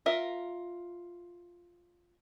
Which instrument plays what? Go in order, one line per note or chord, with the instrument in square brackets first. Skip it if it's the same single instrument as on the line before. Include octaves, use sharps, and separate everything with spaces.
[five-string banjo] F4 A#4 E5